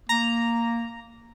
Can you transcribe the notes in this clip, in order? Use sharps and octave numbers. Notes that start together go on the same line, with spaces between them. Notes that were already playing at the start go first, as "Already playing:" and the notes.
A#3 A#5